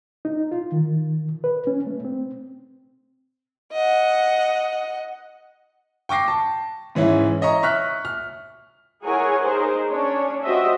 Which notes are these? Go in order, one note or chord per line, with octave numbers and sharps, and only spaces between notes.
D#4
F4
D#3
B4
C#4
A3
C4
D#5 F#5
G5 C#6 D6 A#6 C7
A5
G#2 E3 C#4 E4
C#5 D#5 E5 A#5 C#6
E5 C#6 F6 F#6 B6
F6
E4 G#4 A#4 C#5 F#5 G#5
D#4 G#4 A#4 C5
C#4 D4 C#5
F#4 G4 C5 D#5 E5